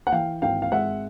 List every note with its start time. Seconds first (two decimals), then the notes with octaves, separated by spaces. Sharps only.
0.07 F#5
0.12 E3 F5 G5
0.42 G#1 F5 G5
0.62 F5
0.72 G#3 E5 F#5